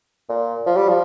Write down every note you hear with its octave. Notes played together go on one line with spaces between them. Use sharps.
A#2
F3
G3
F3